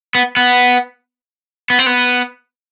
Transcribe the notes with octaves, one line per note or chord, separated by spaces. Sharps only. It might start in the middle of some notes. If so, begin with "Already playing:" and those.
B3
B3
B3
C4
B3